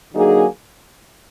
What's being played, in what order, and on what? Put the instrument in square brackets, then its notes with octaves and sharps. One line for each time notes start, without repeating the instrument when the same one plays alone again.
[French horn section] D3 F#3 A#3 D#4 G#4